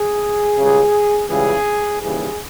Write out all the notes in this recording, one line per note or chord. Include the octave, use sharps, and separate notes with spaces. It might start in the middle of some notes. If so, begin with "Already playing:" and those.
Already playing: G#4
C#2 C#3 G3
C#2 C#3 E3 G3 G#4
D#2 C#3 E3 G3 G#4